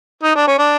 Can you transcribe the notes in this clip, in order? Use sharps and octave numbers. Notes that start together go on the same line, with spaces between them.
D#4
D4
C#4
D4